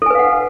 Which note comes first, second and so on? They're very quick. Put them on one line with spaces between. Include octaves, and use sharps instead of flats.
A4 G#5 B4 F5 F#5